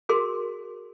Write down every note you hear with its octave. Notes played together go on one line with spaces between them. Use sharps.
F#4 G#4 A#4 C6